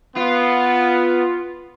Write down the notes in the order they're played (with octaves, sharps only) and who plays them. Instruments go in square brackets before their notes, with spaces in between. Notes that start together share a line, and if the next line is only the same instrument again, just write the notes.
[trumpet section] B3 [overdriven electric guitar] F4